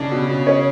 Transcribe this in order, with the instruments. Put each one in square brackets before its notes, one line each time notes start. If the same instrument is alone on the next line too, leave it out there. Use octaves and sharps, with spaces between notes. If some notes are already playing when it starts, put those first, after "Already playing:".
Already playing: [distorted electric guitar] C#3 [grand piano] D4
[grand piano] B2
B2
C#4